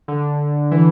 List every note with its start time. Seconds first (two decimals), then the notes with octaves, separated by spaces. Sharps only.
0.08 D3
0.71 E3